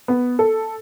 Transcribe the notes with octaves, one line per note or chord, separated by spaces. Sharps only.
B3
A4